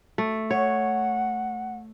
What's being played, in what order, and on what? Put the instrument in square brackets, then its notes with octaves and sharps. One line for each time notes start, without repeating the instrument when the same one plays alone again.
[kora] A3
[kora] C#5 [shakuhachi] F#5